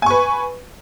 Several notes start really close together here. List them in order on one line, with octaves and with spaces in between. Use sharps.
G#5 C#6 B4